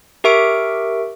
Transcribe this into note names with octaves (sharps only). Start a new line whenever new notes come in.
G4 A#4 E5 C#6 D7